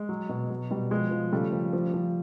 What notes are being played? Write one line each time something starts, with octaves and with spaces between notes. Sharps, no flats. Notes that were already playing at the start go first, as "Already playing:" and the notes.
Already playing: G#3
F#3
B2
F#3
B2 G3
F3 G#3
F3
C#3 G3 A3
F3
F3
F3